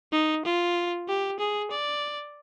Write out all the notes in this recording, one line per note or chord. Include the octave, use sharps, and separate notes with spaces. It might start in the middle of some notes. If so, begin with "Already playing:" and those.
D#4
F4
G4
G#4
D5